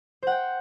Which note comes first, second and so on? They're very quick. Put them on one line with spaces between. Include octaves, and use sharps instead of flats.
C5 F#5 G5